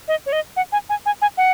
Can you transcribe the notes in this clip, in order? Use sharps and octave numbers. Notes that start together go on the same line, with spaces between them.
D#5
C#5
D#5
F#5
G#5
G#5
G#5
G#5
F#5